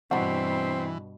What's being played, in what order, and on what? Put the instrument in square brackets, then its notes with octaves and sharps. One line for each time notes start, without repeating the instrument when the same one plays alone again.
[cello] G2 B2 [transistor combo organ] E3 [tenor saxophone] C4 [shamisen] D4 F#4